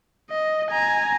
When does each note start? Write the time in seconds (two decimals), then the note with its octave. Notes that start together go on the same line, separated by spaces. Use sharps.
0.30 D#5
0.71 G#5 A#5